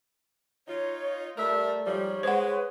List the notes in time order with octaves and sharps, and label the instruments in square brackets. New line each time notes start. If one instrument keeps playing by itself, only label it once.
[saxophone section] D#4 F4 [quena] C#5
[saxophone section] G3 A#4 E5 [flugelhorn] A3 [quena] D5
[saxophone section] G#2 F3 G3 [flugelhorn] C#5
[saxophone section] G#3 [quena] B4 [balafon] C5 F#5